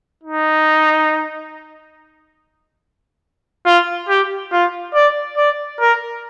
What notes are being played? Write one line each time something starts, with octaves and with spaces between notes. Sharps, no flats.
D#4
F4
G4
F4
D5
D5
A#4